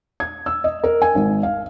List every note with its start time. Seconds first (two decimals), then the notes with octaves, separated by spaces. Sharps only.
0.20 G#6
0.46 E6
0.64 D#5
0.84 A#4
1.02 G#5
1.15 G#1
1.43 F5